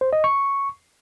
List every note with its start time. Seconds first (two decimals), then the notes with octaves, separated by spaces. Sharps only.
0.01 C5
0.13 D#5
0.24 C#6